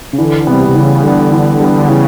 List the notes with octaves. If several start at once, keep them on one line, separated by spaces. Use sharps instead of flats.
C#3
D3 E3
C3 G3 B3
C3
C#3 E3
D3 G3 B3
E3
G3 B3
C#3 E3